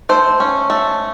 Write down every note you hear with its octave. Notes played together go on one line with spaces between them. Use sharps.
A3 C5
C#4
A3